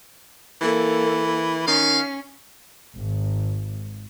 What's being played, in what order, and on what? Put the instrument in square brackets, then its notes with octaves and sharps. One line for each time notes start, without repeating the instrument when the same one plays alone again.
[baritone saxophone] E3 [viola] A#3 A4
[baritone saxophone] D#3 [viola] C#4 [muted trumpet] F5
[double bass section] G#1